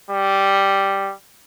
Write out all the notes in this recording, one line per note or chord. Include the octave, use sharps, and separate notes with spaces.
G3